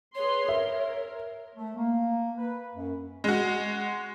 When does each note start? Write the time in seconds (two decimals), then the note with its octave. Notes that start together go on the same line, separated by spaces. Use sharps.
0.15 G#4 B4 C#5 C6
0.49 A#4 E5
1.56 A3
1.76 A#3
2.38 B4
2.75 F#2
3.24 G#3 F#4